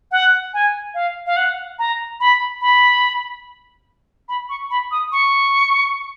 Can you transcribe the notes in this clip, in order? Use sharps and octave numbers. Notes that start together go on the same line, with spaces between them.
F#5
G#5
F5
F5
F#5
A#5
B5
B5
B5
C#6
B5
D#6
C#6